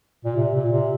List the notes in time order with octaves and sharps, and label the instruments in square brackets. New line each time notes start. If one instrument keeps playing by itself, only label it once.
[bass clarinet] A#2
C3
A#2
C3